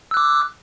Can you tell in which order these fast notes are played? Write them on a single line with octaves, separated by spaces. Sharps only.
E6 F#6 D6